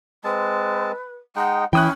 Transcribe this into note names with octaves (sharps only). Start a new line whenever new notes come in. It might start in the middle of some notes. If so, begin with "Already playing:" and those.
G#3 C4 B4 A5
G#3 D#4 F#5 G5
E3 C#4 E4 G5 D#6 F#6